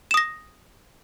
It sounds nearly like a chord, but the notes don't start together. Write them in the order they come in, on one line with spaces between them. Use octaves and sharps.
E7 D#6 A#6